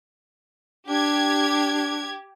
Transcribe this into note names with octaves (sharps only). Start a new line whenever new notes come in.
D4 G4 G#6